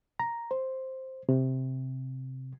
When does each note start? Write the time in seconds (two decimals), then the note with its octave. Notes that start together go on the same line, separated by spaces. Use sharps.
0.20 A#5
0.51 C5
1.29 C3